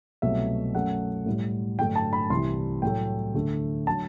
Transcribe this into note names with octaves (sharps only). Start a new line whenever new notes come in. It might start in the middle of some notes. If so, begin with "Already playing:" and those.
C2 B2 F#3 A3 E5
F#2 F#3 A3 F#5
A2 G3
G2 D3 F#3 A3 G5
A5
B5
C2 C3 E3 G3 C6
A2 F#3 A3 G5
D2 D3 A3
D3 F#3 A5